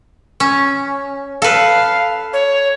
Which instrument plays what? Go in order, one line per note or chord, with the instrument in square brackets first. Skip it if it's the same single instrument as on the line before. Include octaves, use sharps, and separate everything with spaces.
[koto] C#4
[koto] A4 B4 [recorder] F5
[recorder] C#5